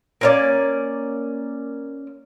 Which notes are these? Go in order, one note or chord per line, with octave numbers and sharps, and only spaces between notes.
A#3 C#4 D5